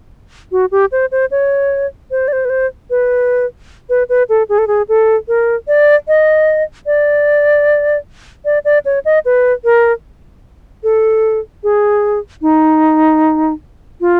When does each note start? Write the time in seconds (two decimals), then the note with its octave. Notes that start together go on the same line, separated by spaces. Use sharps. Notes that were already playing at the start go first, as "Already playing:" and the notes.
0.52 F#4
0.72 G4
0.92 C5
1.12 C5
1.31 C#5
2.11 C5
2.28 D5
2.33 C5
2.45 B4
2.50 C5
2.90 B4
3.89 B4
4.09 B4
4.29 A4
4.49 G#4
4.58 A4
4.67 G#4
4.89 A4
5.28 A#4
5.67 D5
6.08 D#5
6.86 D5
8.45 D5
8.65 D5
8.85 C#5
9.05 D#5
9.25 B4
9.64 A#4
10.83 A4
11.63 G#4
12.42 D#4
14.01 F4